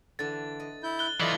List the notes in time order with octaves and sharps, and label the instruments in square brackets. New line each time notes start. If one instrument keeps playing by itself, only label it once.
[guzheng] D3 E3 D4 [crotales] A6
[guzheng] D#5
[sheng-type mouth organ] E4 G6
[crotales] F#6 G7
[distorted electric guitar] E3 F4 [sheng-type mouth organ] E4 D5 D#5 [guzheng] A4 [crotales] F#7